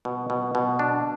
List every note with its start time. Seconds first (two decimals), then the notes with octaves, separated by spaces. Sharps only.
0.05 B2
0.30 B2
0.55 B2
0.79 D4